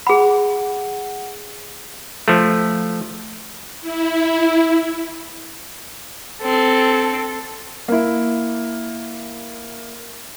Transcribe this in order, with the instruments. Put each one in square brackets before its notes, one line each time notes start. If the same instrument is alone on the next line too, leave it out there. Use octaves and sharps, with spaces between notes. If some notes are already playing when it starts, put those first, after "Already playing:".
[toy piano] G#4 B5 [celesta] F#5
[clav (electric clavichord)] F3 A3
[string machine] E4
[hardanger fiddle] C4 [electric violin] A4
[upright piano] A#3 E4